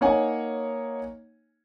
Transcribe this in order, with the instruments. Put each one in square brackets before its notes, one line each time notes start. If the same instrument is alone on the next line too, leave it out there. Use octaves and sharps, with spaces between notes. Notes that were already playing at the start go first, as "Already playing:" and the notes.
[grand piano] A#3 D#4 C#5 F#5 G#5